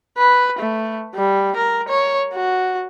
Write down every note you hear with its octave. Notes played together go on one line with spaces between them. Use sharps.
B4
A3
G3
A#4
C#5
F#4